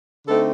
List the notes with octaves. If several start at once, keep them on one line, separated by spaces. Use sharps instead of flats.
D3 A3 C4 D#4 A4